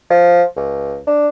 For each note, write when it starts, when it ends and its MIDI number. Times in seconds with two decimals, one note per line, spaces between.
0.10 0.43 53
0.56 0.98 37
1.07 1.28 62